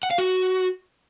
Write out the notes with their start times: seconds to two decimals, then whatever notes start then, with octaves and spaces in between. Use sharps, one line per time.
0.03 F#5
0.11 F5
0.18 F#4